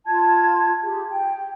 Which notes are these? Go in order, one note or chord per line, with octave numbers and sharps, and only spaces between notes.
F4 A5 G#6
G4 G#4
G5